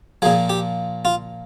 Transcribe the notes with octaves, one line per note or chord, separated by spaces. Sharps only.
A#2 F3 G#4
G4
F4